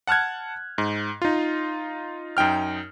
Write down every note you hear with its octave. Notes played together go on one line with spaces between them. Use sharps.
F#5 A5 F6 F#6 G#6
G#2
D#4 F4
F#2 D#4 G5 F6